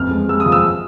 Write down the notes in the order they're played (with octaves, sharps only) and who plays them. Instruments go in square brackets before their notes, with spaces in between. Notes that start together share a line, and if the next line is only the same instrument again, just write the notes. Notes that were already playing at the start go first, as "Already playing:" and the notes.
Already playing: [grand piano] A1 F2 F6
G#3
G#3 E6
D#6
F3
E6